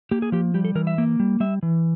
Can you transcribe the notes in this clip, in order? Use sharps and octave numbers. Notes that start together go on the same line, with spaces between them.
A#3 G4
G#4
F3 G4
G3 G4
A4
E3 A#4
E5
A#3
G3
G3 E5
E3